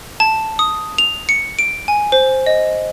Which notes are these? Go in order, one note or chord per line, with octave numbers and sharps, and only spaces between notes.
A5
D#6
F7
C#7
D7
G#5
C5
D#5